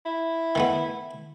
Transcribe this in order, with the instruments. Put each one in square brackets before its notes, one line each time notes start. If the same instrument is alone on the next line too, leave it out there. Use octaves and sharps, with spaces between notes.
[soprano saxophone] E4
[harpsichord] D#3 A3 B3